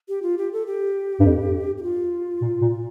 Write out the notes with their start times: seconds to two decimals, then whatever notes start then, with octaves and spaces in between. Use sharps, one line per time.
0.09 G4
0.23 F4
0.38 G4
0.53 A4
0.67 G4
1.20 G2
1.25 F2
1.78 G4
1.83 F4
2.41 A#2
2.61 A#2